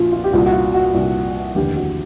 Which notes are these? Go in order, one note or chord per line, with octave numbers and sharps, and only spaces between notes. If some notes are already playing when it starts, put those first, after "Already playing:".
Already playing: A#1 A#2 F3 F4 F#4
F4
G4
C2 A#2 F3 F#4
F#4
F4
F#4
C2 A#2 F3
F1 D#2 D3 G4
F#4